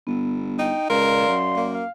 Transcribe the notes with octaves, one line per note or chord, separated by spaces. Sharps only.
G1 B3
D#4 G5
C#2 A#4 D5 F5 C6
F#2
A#3
F5